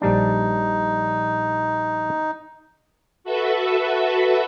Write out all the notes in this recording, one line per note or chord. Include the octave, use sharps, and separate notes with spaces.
A#1 G3 D4 D#4
F#4 A4 B4 E5